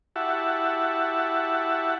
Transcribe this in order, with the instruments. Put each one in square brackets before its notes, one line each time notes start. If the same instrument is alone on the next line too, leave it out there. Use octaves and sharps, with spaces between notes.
[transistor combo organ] E4 F#4 G4 E5 F#5 A5